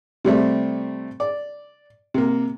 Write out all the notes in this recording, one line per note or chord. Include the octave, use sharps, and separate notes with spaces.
C3 G3 A3 C4
D5
C3 A#3